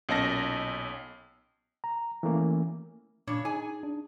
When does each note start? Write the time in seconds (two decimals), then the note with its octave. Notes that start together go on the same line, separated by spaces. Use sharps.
0.09 B1 A#2 C#4 D#5 A5 A#6
1.84 A#5
2.23 E3 A3 A#3 C#4
3.27 A#2 C#3 D4 C#5
3.45 D#4 G#4 G#5
3.83 D4